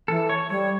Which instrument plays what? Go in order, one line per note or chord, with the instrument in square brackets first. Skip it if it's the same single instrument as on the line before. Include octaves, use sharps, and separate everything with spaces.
[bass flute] E3 [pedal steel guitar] A4
[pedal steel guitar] C#5
[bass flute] G3 [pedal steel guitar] C#5